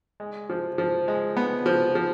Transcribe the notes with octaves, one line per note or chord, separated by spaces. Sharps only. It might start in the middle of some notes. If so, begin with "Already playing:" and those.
G#3
F3
F3
G#3
B3
F3
F3